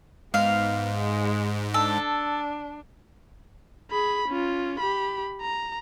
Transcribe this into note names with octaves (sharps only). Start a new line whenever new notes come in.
G#2 B3 F5
G#3
D4 A4
G#4 B5
C#4 F4
G4 B5
A#5